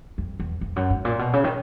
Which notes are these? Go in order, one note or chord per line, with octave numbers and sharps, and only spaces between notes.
F2
E2
F2
F#2
G#2
A#2
B2
C#3
D#3